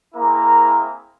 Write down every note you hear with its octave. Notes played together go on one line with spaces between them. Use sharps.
A#3 C4 E4 G#4 A#4 A#5